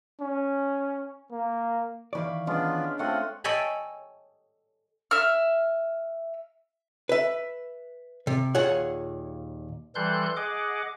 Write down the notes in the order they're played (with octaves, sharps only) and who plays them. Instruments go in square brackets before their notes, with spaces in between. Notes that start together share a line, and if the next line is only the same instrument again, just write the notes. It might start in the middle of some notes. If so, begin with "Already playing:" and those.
[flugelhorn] C#4
A#3
[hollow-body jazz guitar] D#3 E3 D5 [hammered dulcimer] F5 B5 C#6
[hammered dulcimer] G#3 C#4 D4 [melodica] B3 F4
[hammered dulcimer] A3 D#5 [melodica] C4 F4 F#5
[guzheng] A4 C#5 D#5 G5 G#5 B5
[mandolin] E5 F6
[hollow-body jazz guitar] B4 E5
C3
D#2 A#2 G#4 C#5 F#5
[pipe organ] E3 G3 A4 C6 F#6 G6
G#4 D#5 F#5 D6